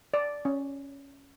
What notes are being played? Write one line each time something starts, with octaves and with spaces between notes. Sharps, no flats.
D5
C#4